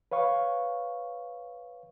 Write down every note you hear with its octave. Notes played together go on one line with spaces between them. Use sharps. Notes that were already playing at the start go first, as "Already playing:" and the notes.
B4 C#5 F5 C#6